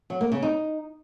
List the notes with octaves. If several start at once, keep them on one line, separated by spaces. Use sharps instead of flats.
F#3
A#3
C#3
D#4